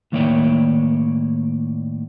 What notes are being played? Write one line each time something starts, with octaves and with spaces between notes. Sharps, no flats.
A2 D#3 A#3 C#5 D5 G5